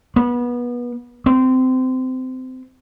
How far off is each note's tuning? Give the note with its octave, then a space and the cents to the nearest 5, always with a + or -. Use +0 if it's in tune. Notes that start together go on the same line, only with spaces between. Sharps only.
B3 -25
C4 -25